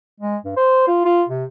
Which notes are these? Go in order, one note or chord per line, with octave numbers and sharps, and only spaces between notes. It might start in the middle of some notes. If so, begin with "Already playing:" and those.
G#3
G2
C5
F4
F4
C3